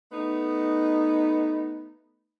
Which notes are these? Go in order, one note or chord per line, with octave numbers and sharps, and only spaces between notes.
A3 B3 D#4